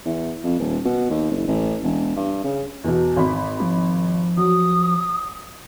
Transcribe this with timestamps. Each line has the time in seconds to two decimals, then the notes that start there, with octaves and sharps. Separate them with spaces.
0.06 E2
0.44 F2
0.59 D#1
0.85 B2
1.10 D#2
1.31 F#1
1.47 A1
1.83 E1
2.16 G2
2.44 C#3
2.84 E2 B2
3.16 G#1 B5
3.60 F3
4.37 F#3 D#6